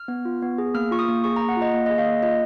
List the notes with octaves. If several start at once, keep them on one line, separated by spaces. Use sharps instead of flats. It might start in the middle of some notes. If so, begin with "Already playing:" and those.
Already playing: F6
B3
F4
B3
G#4
A#3 F6
F4 C#6
D#6
A#3
G#4 C#6
A#5
A#3
F#5
F4
D#5
A#3
G#4 D#5
F5
A#3
F4 D#5